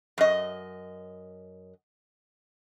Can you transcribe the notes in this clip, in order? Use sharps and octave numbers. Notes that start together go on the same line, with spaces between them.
F#2 D#5